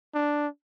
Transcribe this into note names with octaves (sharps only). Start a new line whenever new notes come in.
D4